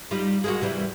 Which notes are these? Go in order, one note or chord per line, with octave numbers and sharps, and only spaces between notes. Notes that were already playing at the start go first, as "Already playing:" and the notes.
G3 D#4 F4
G#3 A#3 F#4
C3 E3 G3